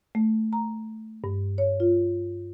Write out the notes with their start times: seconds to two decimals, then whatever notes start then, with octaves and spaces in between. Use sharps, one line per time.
0.15 A3
0.53 A#5
1.24 G2
1.58 C#5
1.80 F4